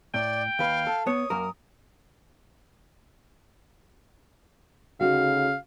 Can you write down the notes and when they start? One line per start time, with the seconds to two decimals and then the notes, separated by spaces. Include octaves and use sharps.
0.14 A2 D5 G5
0.59 D#2 B4 F5
0.87 A4
1.07 B3 C#5 D#6
1.30 F#2 A#3 A#4
5.01 D2 C#3 D#4 F#4 F5